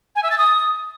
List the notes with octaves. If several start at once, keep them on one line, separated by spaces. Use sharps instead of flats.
G#5
E5
A6
D#6